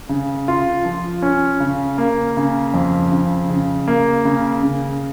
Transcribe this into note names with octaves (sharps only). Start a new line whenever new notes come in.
C#3
F4
F3
C#4
C#3
A#3
C#3
F2
C#3
C#3
A#3
C#3
C#3